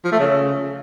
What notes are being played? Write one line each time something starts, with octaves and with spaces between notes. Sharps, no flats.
F3
A3
C#3